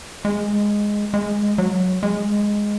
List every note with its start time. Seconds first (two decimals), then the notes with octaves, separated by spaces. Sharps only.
0.25 G#3
1.14 G#3
1.58 F#3
2.03 G#3